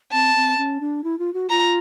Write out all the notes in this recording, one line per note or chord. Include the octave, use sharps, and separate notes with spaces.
C4 A5
C4
C#4
D4
E4
F4
F#4
F4 A#5